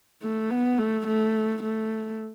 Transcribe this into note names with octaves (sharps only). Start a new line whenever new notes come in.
A3
B3
A3
A3
A3